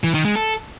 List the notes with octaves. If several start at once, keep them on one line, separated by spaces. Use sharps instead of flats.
E3
D#3
G#3
A4